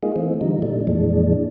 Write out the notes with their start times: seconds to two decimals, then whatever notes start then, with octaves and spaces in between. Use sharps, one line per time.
0.03 G#3 A#3 D#4 F4 G#4
0.16 E3 A3 C4
0.41 D3 E3 F3 G3 D#4
0.62 A#2 G3 A3 D4
0.87 F2 A#2 E3 G#3 D4